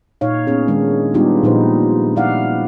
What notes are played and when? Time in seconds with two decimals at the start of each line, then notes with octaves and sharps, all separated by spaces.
0.21 A#2 D#4 C#5 F5
0.47 B3 C#4 G#4
0.68 D#3 G#3 D4
1.14 G3 B3 D4 D#4 F4 G4
1.43 A#2 F3 D#4 B4 C5
2.16 E4 D5 F5 F#5